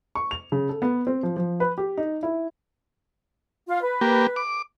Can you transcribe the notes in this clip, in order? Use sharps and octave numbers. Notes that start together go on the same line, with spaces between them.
C#6
F7
C#3
A4
B3
C4
F3
F3
B4
G4
D#4
E4
F4 F5
B4
A#3 G4
D6